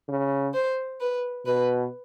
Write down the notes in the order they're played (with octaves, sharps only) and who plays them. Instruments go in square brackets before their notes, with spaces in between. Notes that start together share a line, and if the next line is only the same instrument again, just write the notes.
[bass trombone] C#3
[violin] C5
B4
[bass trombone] B2 [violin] B4